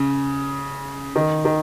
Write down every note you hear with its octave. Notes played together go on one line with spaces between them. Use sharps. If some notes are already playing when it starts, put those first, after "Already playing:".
Already playing: C#3
D#3
D#3